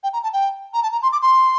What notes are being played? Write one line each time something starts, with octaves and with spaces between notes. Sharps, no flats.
G5
A#5
A5
G5
A#5
A5
A#5
C6
D6
C6